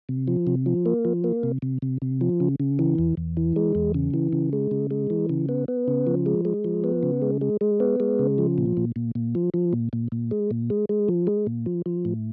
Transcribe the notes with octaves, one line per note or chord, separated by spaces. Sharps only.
C3
F3
C3
F3
A#3
F3
A#3
C3
C3
C3
C3
F3
C#3
C#3
E3
E2
E2
E3
G#3
E2
C#3
E3
C#3
G#3
C#3
G#3
E3
C#3
B3
B3
C#3
F3
G#3
G#3
F3
B3
C#3
G#3
G#3
G#3
B3
G#3
C#3
F3
A#2
A#2
A#2
A#2
F3
F3
A#2
A#2
A#2
G#3
A#2
G#3
G#3
F3
G#3
A#2
F3
F3
A2